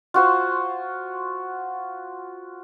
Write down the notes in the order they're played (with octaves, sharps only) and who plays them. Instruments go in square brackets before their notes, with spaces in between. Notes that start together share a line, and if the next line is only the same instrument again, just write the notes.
[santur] F4 F#4 C5